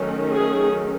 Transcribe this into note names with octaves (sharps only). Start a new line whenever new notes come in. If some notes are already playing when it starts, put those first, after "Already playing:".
Already playing: D#3 F#3 A3 C#4
G#4